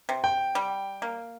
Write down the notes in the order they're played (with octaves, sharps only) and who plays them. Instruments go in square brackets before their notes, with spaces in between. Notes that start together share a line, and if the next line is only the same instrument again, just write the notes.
[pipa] C3
[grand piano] G5
[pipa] G3
A#3